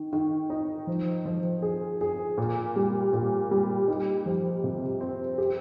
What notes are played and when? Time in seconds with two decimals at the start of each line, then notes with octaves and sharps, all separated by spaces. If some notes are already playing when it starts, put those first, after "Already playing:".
Already playing: D#3
0.13 D#3
0.50 D#4
0.87 F3
1.25 F3
1.62 G#4
2.01 G#4
2.38 A#2
2.76 G3
3.13 A#2
3.51 G3
3.88 D#4
4.26 F3
4.64 C3
5.01 C4
5.38 G4